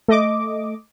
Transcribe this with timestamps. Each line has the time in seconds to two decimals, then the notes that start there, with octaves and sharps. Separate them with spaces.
0.08 A3 D#5 D6